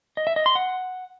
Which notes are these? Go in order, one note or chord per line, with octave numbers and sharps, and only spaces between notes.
D#5
E5
D#5
C6
F#5